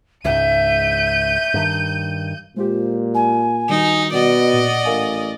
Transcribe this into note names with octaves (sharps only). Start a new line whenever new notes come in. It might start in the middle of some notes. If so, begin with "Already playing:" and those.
C#2 G#2 E5 G6 D#7
G2 D#3
A#2 G#3 F4 G4 C5
G#5
D#3 G3 D#4 F#4
B2 D5 D#5 F#5
A#2
A1 A#4 F5 G#5